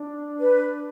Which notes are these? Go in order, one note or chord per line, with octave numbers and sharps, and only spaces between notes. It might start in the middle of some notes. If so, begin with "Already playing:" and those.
Already playing: D4
B4